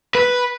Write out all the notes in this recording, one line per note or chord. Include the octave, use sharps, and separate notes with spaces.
B4